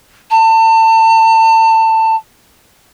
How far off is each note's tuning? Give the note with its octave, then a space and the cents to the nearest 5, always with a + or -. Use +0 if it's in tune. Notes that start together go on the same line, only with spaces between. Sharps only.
A5 +30